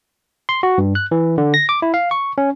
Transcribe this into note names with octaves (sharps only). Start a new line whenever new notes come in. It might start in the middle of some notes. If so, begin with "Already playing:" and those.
C6
F#4
G2
F#6
E3
D3
A#6
D6
E4
F5
C#6
C#4